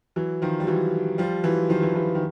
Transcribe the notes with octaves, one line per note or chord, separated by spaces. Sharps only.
E3 F#3
D#3 F3
G3
E3 F#3
F3 G3
E3 F#3
D#3 F3
E3 F#3
E3 F#3
D#3